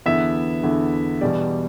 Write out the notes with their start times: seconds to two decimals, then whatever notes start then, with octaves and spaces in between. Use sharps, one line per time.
0.06 E2 D3 B3 E4 E5
0.63 E2 D3 B3 E4
1.21 E2 B2 G3 D5